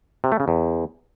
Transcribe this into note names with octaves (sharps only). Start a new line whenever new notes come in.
C3
A3
C#3
E2